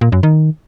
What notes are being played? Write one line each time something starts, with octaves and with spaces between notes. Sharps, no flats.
A#2
F#2
D#3